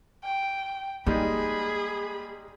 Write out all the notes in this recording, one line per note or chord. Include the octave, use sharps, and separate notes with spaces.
G5
G3 G#3 A#3 D#4 G#4 B5